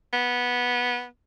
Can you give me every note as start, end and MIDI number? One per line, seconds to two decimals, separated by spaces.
0.13 1.06 59